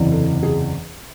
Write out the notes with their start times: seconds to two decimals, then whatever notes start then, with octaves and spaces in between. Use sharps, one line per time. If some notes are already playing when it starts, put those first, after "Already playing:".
Already playing: F#1 E2 C3 E3
0.12 A4
0.43 G#4